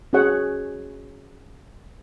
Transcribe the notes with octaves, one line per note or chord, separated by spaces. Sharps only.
C#4 F#4 G#4 C#5 F#5